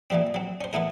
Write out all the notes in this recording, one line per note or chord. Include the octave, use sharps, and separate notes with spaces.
A#2 E3 F3 G3 C4
F#3 C4
C#4 C5
E3 A3 B3 E4 A#4